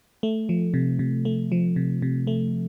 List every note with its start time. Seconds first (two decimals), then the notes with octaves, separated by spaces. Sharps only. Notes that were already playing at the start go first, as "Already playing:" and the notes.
0.23 A3
0.49 F3
0.74 C3
0.99 C3
1.25 A3
1.52 F3
1.76 C3
2.02 C3
2.27 A3